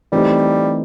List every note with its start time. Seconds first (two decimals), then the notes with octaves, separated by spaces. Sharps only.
0.12 E3 G3 A3 C4 D#4 G4